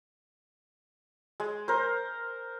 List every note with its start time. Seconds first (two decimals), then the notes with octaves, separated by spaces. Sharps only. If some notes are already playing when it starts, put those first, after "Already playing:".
1.40 G#3
1.68 A#4 C5